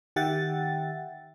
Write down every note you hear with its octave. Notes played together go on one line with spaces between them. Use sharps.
D#3 G4 E5 F#5 G5 A6